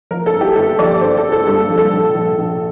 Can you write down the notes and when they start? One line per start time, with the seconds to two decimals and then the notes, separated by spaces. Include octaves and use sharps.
0.11 F3 A#4
0.26 A4
0.34 G1
0.41 G4
0.56 G1 A4
0.79 F3 D5
1.01 G1 C5
1.17 A4
1.24 D3
1.32 A4
1.47 G2 A4
1.70 F3
1.78 A4
1.93 A#1
2.15 A#1
2.39 A#1